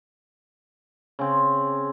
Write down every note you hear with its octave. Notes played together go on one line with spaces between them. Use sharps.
C#3 C4